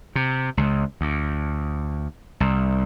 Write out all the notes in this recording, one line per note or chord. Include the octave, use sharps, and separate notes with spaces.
C3
C#2
D2
C2